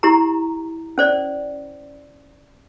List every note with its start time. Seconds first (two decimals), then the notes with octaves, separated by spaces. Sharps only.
0.03 E4 G4 A#5
0.98 C#4 C5 D5